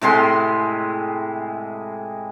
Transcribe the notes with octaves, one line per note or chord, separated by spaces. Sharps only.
A2 C3 G#3 C6